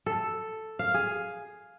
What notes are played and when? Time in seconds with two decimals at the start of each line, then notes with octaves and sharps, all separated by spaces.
0.06 A4
0.79 F5
0.94 G#4